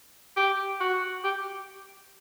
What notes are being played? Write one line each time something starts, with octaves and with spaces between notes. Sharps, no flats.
G4
F#4
G4